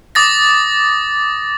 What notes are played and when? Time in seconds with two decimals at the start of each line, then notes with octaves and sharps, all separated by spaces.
0.15 D6 D#6 A6 A#6